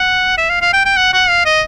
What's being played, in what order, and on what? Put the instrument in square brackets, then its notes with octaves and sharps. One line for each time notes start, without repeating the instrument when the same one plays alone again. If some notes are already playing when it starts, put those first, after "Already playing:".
Already playing: [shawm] F#5
E5
F5
F5
G5
G5
F#5
F#5
F5
D#5